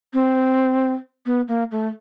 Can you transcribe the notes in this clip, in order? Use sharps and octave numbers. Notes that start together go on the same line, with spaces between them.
C4
B3
A#3
A3